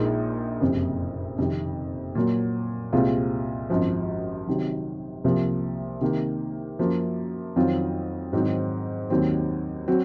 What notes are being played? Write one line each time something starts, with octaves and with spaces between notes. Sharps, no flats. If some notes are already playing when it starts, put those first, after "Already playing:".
Already playing: A#1 A#2 G#3 D#4 A#4
F#1 F2 C3
F2 C3 D#3
A#2 F#3 A#3
C2 A#2 G#3 C4 F4
G#1 F#2 F3
C3 D#3 F#3
C2 C3 F3 A#3
C3 D#3 A#3
F#2 F3 A#3
F2 D#3 F#3 C4 F4
G#2 D#3 F#3 C4 D#4
D#2 D#3 F#3 C4
F#3 C4 F#4